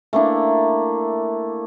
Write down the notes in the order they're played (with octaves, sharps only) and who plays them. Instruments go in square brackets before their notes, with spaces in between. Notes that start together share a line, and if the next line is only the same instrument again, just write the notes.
[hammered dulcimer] A3 A#3 D4 E4